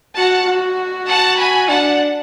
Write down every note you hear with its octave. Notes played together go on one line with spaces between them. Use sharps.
F#4 F#5 A5
F#4
F#5 A5
G#5 B5
D4 F#5 A5